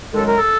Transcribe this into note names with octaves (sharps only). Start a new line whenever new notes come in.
F#2 D#3 G#3 A4
A#4
A4